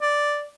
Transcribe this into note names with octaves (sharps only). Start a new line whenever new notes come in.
D5